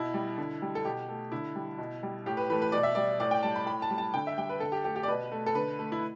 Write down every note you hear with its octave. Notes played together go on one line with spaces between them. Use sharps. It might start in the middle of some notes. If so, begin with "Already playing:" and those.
Already playing: B2 E4
G3
D3
G3
A4
B2 G4
A3
D3 E4
G3
B2
G3
A2 G4
B4
E3 A3 B4
B4
B2 D5
E5
G3 D5
A2 D5
G5
G3 A5
B5
A2 B5
A5
G3
A5
D3 G5
E5
G3 G5
B4
D3 A4
G4
A3 G4
G4
D5
B2 B4
A3
A4
D3 B4
A3
E4